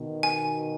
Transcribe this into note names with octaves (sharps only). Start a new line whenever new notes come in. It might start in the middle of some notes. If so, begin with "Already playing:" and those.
Already playing: B2 D#3
G#5